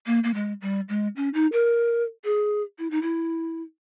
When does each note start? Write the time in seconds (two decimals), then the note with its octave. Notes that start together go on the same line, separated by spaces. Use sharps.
0.07 A#3
0.24 A#3
0.34 G#3
0.62 G3
0.89 G#3
1.16 C#4
1.34 D#4
1.53 A#4
2.24 G#4
2.79 E4
2.91 D#4
3.02 E4